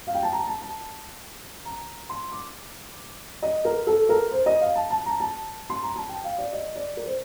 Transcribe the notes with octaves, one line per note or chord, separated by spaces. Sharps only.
F5
G5
A5
A#5
A5
A5
A#5
C6
D6
D#5
A#4
A4
A#4
C5
D#5
F5
A5
A5
A#5
A5
C6
A#5
A5
G5
F5
D5
D#5
D5
A#4
C5